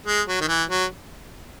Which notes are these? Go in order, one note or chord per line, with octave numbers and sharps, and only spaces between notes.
G#3
F#3
D#3
E3
F#3